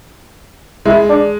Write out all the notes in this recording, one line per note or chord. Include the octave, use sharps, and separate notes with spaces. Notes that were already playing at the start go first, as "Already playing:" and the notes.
G#3 E4
D4